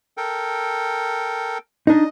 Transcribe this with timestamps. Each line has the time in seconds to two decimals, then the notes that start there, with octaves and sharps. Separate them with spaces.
0.17 A4 A#4 G5
1.87 D4 D#4 D#5